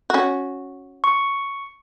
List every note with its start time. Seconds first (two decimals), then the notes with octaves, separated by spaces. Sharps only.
0.10 C#4 F#4
1.04 C#6